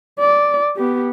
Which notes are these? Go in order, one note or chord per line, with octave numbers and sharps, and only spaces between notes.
D5
B3 G4